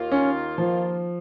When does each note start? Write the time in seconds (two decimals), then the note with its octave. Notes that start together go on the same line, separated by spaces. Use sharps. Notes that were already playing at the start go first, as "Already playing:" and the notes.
Already playing: D#2 D#3 A#3 F4
0.12 C#4
0.58 F3